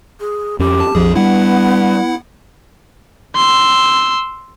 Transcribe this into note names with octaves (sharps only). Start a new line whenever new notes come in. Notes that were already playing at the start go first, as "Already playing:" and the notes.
G#4
F2 C#4 G4
A5
A#1 F2 F3 G#4
G3 B3 D4 E4 F#5
C6 E6